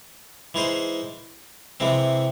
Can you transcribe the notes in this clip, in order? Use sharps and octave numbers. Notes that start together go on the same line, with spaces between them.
E3 G#3 D#4 G#4 C5
C3 E3 G#3 C4